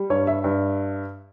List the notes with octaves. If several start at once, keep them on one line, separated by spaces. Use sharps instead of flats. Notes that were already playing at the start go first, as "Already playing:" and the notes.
Already playing: G3
G2 C#5
E5
G2